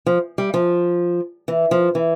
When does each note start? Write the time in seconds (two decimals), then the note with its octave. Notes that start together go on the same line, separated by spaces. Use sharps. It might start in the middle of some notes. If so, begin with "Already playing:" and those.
0.06 F3
0.38 G3
0.54 F3
1.48 E3
1.71 F3
1.95 E3